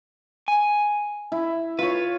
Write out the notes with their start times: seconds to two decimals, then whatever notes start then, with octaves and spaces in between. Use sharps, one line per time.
0.48 G#5
1.32 E4
1.79 F4 B4 C#5